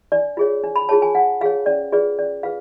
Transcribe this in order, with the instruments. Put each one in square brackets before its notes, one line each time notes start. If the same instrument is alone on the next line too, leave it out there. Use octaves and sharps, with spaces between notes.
[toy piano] D4 D5
F4 G#4 C#5
D4
B5
F4 G#4 C#5 A5
G#5
D4 F#5
F4 G#4 C#5 F5
C#4 D5
F4 G#4 B4 D5
C#4 D5
F4 G#4 B4 F5